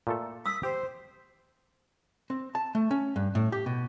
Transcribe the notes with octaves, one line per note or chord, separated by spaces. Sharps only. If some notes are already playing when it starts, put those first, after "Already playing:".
A#2 A3 A4
D#6 E6 B6
G4 C5
C4
A5
A3
C#4
G2
A2
G4
B2